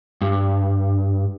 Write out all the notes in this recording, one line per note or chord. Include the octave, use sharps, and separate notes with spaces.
G2